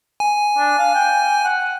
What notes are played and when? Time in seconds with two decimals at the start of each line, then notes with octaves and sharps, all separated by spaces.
0.20 G#5
0.58 D4
0.78 F5
0.95 G5
1.45 F#5